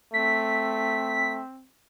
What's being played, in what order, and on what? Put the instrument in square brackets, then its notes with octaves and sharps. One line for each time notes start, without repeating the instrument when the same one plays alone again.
[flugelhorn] A3 [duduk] C4 [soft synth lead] B6